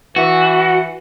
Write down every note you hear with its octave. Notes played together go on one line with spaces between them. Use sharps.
E3 F#4